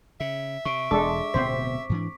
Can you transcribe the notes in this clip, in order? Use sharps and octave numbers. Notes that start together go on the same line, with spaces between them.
C#3 E5
C3 C#6 D7
E1 G#3 D4 A4 D6
D1 B2 B3 C4 C5 B6
G#2 E3 D4